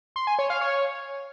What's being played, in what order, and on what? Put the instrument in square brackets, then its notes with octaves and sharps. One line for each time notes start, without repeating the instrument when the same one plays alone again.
[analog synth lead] C6
G#5
C#5
F5
C#5